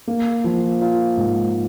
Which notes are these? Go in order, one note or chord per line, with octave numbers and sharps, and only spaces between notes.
A#3
F3
F4
G#2